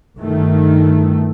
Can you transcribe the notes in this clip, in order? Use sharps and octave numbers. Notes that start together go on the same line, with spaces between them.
G1 D#3 A3